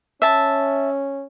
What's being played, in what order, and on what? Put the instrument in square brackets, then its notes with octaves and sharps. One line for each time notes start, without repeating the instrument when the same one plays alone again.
[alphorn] C#4 [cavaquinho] E5 A5